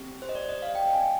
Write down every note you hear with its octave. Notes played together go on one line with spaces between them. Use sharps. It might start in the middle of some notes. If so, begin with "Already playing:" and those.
Already playing: C4 G4
C5
D#5
D5
D#5
F5
G5
G#5